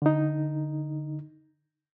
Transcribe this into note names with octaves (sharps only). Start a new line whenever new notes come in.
D3 D#4